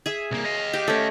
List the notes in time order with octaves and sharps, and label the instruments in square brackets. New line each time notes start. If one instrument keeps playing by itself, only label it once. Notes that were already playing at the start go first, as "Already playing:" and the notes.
[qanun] G#4 E5
[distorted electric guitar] C2 A#3
D#5 F5
[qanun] G4
A3 C#4